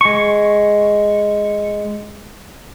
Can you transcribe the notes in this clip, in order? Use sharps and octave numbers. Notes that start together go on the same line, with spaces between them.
G#3 C#6